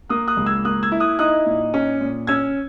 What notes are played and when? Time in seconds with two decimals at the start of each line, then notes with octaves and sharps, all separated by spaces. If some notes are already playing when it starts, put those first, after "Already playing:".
0.09 A#3 D#6 F#6
0.28 D#6 F#6
0.37 C#2
0.46 E6 G#6
0.65 A#3 D#6 F#6
0.83 E6 G#6
0.92 E4
1.00 D#6 F#6
1.19 D#4 D#6 F#6
1.46 A#2
1.74 C#4
2.01 A#2
2.27 C#4 E6 G#6